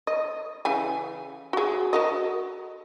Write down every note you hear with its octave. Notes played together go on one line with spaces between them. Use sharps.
D#5
C#3 E3 G#5
F#4 G#4
F#4 A#4 D#5